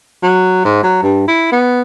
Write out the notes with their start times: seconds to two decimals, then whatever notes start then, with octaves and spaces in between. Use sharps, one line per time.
0.23 F#3
0.65 G#2
0.84 F#3
1.03 G2
1.28 E4
1.52 B3